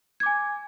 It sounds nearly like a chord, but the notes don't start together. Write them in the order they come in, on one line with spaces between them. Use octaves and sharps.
G#6 D6 G#5